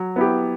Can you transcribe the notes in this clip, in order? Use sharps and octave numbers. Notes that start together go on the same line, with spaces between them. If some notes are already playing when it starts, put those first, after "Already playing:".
Already playing: F#3
B3 E4 G4